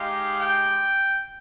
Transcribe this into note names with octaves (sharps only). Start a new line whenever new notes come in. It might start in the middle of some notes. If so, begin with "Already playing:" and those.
Already playing: G#3 D#4 G4 F5
G5